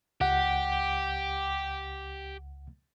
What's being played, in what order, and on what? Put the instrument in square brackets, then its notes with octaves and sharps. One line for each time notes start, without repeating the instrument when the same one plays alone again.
[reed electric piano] C#2 F#5 [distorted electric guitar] G4